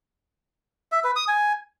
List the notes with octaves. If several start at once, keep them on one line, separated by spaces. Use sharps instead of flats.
E5
B4
D#6
G#5